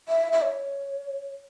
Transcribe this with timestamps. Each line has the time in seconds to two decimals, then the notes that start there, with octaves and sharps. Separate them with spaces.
0.08 E5
0.32 E5
0.42 C#5